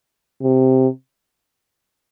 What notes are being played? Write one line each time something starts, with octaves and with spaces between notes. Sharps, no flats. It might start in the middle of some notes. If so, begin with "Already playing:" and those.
C3